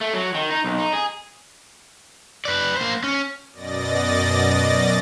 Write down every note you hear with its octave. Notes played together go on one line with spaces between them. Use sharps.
A3
F#3
D#3
D#4
B1
D#4
G#4
B4 D5
A#3 C5
C#4
F#2 B2 D5 D#5 A6 A#6